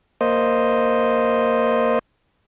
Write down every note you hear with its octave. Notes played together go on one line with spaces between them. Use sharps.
A#3 C5 D#5